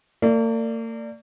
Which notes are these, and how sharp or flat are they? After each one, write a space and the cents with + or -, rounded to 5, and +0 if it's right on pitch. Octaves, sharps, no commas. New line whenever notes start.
A#3 -45 D5 +0